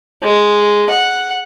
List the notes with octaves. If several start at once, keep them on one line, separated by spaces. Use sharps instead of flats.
G#3
F#5